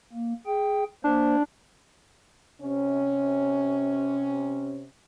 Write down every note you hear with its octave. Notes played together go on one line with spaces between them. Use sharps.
A#3
G#4 G5
A#3 D4 C5
C3 C#4